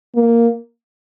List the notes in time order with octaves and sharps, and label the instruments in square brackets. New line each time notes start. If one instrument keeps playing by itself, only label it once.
[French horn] A#3